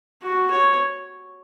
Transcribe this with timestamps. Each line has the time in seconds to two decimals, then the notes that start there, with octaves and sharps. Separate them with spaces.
0.23 F#4
0.50 C#5